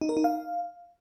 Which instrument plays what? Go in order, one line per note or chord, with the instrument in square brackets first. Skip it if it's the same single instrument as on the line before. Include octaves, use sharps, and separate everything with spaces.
[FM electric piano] D#4
A#4
D#4
F5